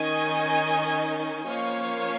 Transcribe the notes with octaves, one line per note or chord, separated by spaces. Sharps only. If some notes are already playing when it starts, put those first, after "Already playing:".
Already playing: D#3 C#4 D#5 G#5
F3 A#3 C#4 C#5 F5